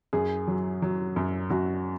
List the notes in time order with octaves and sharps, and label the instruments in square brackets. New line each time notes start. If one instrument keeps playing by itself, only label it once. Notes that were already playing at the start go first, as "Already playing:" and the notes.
[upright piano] F#2 G#4
F#3
F#3
F#2
F#2 F#4